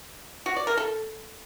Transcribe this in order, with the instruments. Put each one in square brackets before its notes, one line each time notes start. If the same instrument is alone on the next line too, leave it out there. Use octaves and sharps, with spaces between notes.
[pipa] F#4
D5
A#4
A4